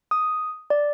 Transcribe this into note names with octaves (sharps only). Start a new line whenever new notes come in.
D#6
D5